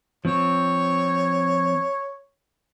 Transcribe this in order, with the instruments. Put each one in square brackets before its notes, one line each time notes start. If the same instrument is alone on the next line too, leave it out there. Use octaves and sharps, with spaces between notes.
[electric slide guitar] F3 C4 [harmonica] C#5